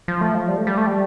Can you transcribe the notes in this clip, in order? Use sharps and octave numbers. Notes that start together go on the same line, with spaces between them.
F3
A3
F3
G3
A3
G3
A3
G3